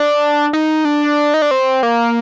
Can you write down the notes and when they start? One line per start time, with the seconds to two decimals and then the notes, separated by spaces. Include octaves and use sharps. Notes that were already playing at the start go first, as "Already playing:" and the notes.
Already playing: D4
0.53 D#4
0.85 D4
1.34 D#4
1.42 D4
1.51 C4
1.83 A#3